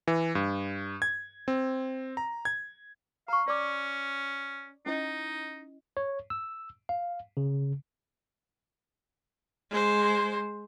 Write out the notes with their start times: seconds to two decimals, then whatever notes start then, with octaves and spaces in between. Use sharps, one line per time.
0.07 E3
0.35 G2
1.02 G#6
1.48 C4
2.17 A#5
2.45 G#6
3.28 F5 A#5 C#6
3.48 C#4 D5 D6
4.86 C#4 D#4 E4 D#5
5.97 C#5
6.30 E6
6.89 F5
7.37 C#3
9.70 G#3 C5